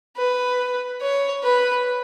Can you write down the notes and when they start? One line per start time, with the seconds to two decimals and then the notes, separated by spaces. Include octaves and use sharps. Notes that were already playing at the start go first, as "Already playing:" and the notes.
0.17 B4
1.01 C#5
1.44 B4